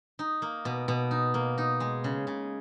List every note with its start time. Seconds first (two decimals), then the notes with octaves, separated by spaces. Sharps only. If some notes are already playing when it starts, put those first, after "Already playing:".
0.19 D#4
0.42 A#3
0.65 B2
0.88 B2
1.11 D#4
1.34 A#3
1.58 D#4
1.80 G#3
2.04 C#3
2.27 C#3